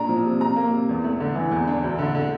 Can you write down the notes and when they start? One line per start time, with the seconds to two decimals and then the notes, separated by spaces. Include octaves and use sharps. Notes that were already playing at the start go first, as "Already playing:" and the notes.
Already playing: A#2 D4 A#5
0.09 F3
0.26 C3
0.40 C3 A#5
0.56 A#3
0.72 C3
0.89 E2
1.04 A3
1.20 D3
1.35 E3
1.51 E2
1.67 D4
1.84 D2
1.99 D3
2.15 D3